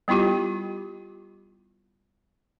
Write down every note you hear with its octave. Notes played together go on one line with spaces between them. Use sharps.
G3 B3 E4 F4 G4